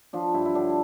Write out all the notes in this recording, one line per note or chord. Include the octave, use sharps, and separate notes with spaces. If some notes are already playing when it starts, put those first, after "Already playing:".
F3 D4
G2 E4
E4
D3 D4